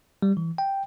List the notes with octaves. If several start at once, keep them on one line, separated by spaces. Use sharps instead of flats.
G3
E3
G5